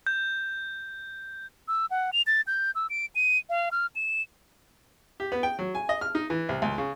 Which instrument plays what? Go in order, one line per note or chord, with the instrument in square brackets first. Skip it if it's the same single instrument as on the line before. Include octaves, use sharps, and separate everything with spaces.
[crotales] G6
[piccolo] E6
F#5
F7
A6
G6
E6
D7
D#7
F5
F6
E7
[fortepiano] G4
B3
G5
F#3
G#5
D#5
F6
D#4
E3
C2
C#2
C#3